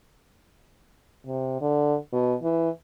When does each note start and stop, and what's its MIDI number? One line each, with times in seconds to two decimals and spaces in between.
1.26 1.59 48
1.61 1.95 50
2.13 2.34 47
2.43 2.69 52